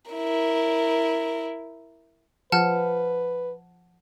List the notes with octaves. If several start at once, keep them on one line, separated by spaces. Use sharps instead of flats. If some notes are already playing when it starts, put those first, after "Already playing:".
E4 A#4
F3 B4 F#5 A5 F6